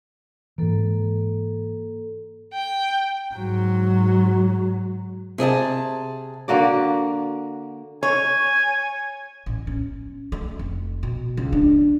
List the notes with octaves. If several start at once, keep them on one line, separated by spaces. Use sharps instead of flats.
G#2 E3 A#3 A4
G5
G#2 F#3
C3 G#4 D#5 A5
D3 A#3 F#4 D5
C#5 G#5
A1
C#4
A3
F1
B2
C#2
D4